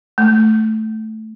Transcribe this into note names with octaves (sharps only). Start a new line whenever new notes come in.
A3